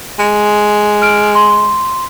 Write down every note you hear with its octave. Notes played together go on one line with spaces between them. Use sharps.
G#3
F6 D7
C6